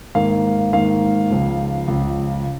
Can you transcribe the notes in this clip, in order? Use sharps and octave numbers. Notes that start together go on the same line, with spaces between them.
G#2 D#3 A#3 F5
G#2 D#3 A#3 F5
C#2 C#3 F3
C#2 C#3 F3